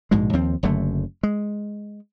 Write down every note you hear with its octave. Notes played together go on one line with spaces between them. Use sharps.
A#1 G#2 B2 G#3
D#2 F3 C4
F#1 F#2 D3 A3
G#3